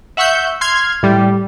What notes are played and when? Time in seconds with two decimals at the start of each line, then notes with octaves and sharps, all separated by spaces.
0.17 E5 F#5 C#6 E6 G6
0.61 C6 F6 G#6
1.03 A2 G3